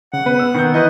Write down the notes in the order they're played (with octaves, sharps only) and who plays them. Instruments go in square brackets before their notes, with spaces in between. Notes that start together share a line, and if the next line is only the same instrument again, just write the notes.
[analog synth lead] C#3 [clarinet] F#5
[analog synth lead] B3 [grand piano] B4
[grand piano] E6
[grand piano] D#3 G6 [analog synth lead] B3
[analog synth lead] E3 [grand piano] B4 G6 [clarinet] D#5